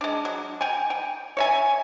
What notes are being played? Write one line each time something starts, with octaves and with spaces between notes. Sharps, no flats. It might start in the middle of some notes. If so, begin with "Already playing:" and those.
G#3 D4
F#3
G5 G#5
G5
C#5 E5 G#5